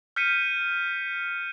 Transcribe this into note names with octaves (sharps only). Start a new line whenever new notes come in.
F6 G6 B6 C#7 D#7